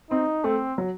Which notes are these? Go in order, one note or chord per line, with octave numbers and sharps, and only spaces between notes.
C4 D#4
A3 C4
F#3